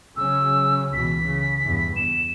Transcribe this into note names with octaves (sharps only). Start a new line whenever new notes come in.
C#3 F#3 C#4 E6
C#2 B2 E3 B6
C#3
E2 G2 E3
E2 E7